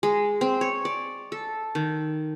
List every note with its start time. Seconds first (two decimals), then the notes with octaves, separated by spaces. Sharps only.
0.03 G#3
0.41 C4
0.61 C#5
0.85 D5
1.32 A4
1.75 D#3